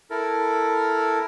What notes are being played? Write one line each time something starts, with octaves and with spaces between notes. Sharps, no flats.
E4 A4 A#4